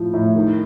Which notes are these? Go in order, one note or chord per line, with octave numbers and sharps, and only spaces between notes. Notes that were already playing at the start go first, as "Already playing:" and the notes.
Already playing: A2 F3
A2
D#3